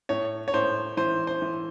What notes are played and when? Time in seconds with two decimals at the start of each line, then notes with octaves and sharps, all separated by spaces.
0.09 A2 C#5
0.48 C#5
0.54 A2 C5
0.97 E3 C5
1.27 C5
1.42 E3